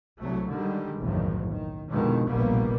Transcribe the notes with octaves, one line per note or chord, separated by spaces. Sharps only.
C2 F#3 A3
D3 D#3 G3 G#3
F#1 B1 E2 A2 D#3 F3
D#3
F2 B2 D3 D#3 F3 G#3
F1 A#1 B2 G3 A#3 B3